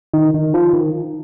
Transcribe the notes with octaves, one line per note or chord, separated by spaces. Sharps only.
D#3
D#3
F3
D#3